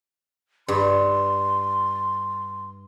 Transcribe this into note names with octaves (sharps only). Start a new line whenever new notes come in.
G2 C6